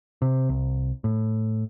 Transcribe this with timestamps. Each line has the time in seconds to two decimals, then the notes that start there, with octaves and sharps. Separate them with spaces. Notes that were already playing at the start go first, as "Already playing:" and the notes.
0.22 C3
0.49 C2
1.04 A2